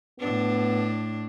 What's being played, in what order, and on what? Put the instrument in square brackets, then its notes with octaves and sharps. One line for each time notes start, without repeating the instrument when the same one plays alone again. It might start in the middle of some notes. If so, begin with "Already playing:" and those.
[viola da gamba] A2 D4 [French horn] B3